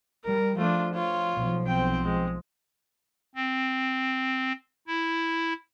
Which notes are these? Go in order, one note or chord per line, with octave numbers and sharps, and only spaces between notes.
G3 A#4
F3 A3 D4 F4
F4 C#5
B1 F3
C4 G5
G#3
C4
E4